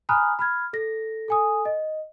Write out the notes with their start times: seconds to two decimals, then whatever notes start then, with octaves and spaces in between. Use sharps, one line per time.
0.09 G#5 A#5 B5 D#6 F6 F#6
0.39 B5 F6 G#6
0.73 A4 A#6
1.28 A4 G#5 D#6
1.65 D#5